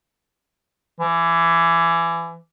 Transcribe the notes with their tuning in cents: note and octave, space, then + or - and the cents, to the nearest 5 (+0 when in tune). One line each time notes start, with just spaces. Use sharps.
E3 +25